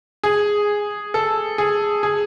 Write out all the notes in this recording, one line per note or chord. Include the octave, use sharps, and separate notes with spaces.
G#4
A4
G#4
G#4